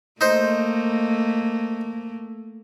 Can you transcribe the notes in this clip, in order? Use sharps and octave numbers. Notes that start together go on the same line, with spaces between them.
A3 A#3 D#4 C5